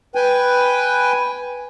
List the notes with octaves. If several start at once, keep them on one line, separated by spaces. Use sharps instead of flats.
B4 G5 G#5